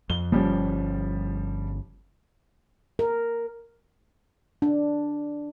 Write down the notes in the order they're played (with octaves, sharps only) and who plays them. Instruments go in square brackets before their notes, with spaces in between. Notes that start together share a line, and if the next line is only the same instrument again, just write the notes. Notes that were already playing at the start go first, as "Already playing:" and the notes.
[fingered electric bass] F2 [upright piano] G7
[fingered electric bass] G1 C3 C#4 [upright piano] F3 G3
[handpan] A#4
D4